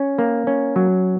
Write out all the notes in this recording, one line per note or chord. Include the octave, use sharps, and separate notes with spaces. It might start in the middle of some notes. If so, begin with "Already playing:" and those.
Already playing: C#4
A#3
C#4
F#3